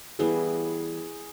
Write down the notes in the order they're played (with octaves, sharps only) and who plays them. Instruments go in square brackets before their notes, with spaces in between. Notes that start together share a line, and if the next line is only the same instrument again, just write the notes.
[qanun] E3 G3 B3 [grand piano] G#4